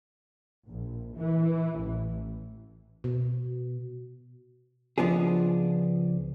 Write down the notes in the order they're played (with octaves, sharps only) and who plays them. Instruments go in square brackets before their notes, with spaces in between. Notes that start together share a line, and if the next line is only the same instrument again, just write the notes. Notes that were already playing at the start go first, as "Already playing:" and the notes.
[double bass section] A#1
E3
A1
[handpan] B2
[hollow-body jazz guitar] C#2 F3 B3 D4 G#4